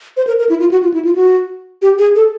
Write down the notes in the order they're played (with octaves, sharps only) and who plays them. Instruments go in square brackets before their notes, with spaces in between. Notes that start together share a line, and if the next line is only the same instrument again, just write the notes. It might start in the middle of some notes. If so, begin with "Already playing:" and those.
[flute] C5
A#4
A#4
E4
F4
F#4
F4
E4
F4
F#4
G4
G#4
A4